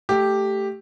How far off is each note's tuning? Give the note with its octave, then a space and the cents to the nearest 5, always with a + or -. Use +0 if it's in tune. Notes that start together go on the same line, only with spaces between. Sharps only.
A3 +0 G4 +0